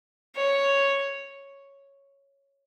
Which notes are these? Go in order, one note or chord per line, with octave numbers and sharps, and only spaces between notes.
C#5